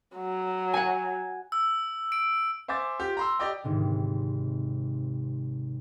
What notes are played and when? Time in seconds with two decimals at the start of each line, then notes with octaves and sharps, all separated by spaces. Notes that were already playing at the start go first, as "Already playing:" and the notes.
0.17 F#3
0.74 F#5 G#5
1.52 E6
2.12 D7
2.68 C5 E5 G#5 D6 A6
3.00 F4 G4
3.17 A#5 C6 E6
3.39 G4 D5 D#5 G5
3.64 G#1 G#2 C3